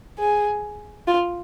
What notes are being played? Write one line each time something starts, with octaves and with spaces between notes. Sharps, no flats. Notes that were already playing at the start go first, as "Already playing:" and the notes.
G#4
F4